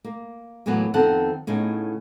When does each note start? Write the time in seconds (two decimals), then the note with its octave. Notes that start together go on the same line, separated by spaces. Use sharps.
0.04 A#3
0.66 E2 A2 F#3 A#3 B3
0.94 F2 D#3 B3 C4 A4 F#5
1.47 A2 C#3 B3 D#4